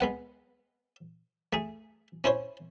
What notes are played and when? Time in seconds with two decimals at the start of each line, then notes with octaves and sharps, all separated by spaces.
0.01 G#3 B3 F#5
1.53 A3 G#4
2.24 C#4 E4 C5 C#5